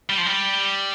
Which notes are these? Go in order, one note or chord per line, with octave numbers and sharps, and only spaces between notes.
G3
F3
G3